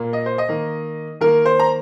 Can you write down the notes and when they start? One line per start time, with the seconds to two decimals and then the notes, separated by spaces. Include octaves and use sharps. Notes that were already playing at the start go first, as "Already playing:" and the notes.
Already playing: A#2 A#3
0.13 D#5
0.26 C5
0.38 D#5
0.49 D#3 A#3
1.21 D#3 A#3 A#4
1.46 C5
1.59 A#5